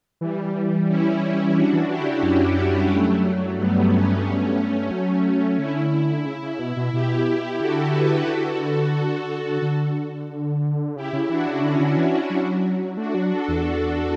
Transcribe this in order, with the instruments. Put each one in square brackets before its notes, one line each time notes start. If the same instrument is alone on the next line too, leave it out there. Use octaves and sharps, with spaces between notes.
[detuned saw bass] E3 [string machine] G3
[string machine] C#4 E4
D4 F#4
[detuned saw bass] E3
[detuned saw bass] E3 [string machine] E4 G4
[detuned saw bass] D3
C#3
[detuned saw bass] F#2 [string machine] C#4 E4
[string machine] G3
F#3 A3
[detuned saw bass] G2 [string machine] G3 B3
[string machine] A3 C#4
[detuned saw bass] F#3
[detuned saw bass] D3 [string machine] C#4 E4
[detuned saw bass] C#3
C#3
B2
B2
[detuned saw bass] B2 [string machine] E4 G4
[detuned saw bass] D3 [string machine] F#4 A4
[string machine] G4 B4
[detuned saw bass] D3 [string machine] F#4 A4
[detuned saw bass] D3
[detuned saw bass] C#3 [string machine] E4 G4
[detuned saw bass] C#3
[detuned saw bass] E3 [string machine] D4 F#4
[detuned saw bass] C#3
[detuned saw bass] D3 [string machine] C#4 E4
[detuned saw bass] D3
E3
F#3
[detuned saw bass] A3 [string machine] D4 F#4
[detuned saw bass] F#3
[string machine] F#4 A4
[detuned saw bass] E2